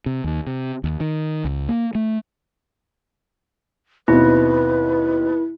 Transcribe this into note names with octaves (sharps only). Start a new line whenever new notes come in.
C3
D#2
C3
D#2
D#3
C#2
A#3
A3
D#2 B2 C4 E4 B4